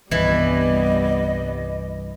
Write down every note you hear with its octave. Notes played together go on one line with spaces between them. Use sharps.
C2 G2 E3 G3 B3 D#5